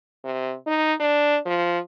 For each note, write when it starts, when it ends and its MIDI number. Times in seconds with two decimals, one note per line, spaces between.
0.24 0.55 48
0.67 0.94 63
1.00 1.38 62
1.46 1.79 53